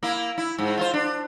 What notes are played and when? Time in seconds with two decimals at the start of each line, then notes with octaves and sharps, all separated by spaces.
0.03 A#3 E4
0.38 E4
0.59 G#2
0.77 F4 A4 C5
0.94 D4